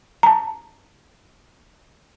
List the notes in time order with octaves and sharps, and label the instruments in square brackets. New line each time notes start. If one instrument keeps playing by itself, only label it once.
[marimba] A5 A#5